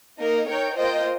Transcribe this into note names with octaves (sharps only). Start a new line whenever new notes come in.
A#3 D#4 A#4 D#5
D#4 A#4 C#5 G5
A#3 F4 C5 D#5 G5